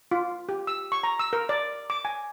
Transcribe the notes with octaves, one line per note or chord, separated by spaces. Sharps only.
F4
G4
E6
C#6
A#5
E6
A#4
D5
D6
G#5